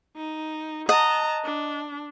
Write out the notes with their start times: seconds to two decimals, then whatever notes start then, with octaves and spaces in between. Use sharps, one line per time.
0.16 D#4
0.89 D#5 F#5 A5 A#5
1.44 D4